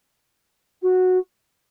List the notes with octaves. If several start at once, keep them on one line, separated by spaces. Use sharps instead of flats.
F#4